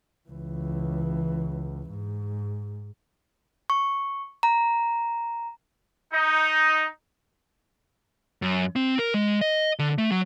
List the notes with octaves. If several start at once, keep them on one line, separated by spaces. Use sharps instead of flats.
C#2 E3
G#2
C#6
A#5
D#4
F#2
C4
A#4
G#3
D#5
D3
A3
F#3